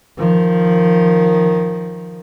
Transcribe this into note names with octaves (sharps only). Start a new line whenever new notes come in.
D#3 F3